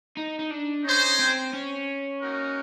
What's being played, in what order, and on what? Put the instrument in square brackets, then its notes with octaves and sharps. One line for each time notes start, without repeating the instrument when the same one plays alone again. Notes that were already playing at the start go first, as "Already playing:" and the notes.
[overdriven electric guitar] D#4
D#4
D4
[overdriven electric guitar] C#4 [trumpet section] D#4 G#4 C5
[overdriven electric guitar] C4
C#4
[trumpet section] A#3 D#4 F#4 A#4